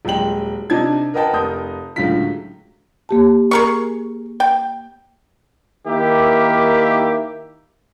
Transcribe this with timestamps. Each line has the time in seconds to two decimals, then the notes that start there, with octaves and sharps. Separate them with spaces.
0.05 D#1 F#3 G#3 G5 F#7
0.70 C3 D4 D#4 A5 G#6
1.14 A#4 B4 D#5 F#5 G5 A5
1.33 F1 A#4 D#6 G6
1.96 C#2 A2 D3 F#3 F4 B6
3.09 A#3 G4 A5
3.51 G#4 A#4 C#6
4.40 G5
5.87 D#3 A#3 E4 G4 E5